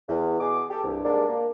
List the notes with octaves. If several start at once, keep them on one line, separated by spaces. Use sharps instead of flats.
E2
B2 G#4 D6
G4 A4
C2 G2
G#2 G3 G#3 A#3 D4
A#3